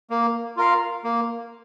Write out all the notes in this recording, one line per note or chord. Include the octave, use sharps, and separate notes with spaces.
A#3
F4 A#4 F5
A#3